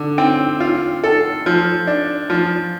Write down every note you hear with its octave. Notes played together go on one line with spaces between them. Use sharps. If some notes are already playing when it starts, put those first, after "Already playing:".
Already playing: D3
C4
F4
A4
F3
D4
F3